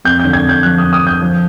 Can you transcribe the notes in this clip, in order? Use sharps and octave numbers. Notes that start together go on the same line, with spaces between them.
F2 G6
D3 G6
G#6
F2
G6
F3 F#6
F2 D#6
D#6
D3
G6
F3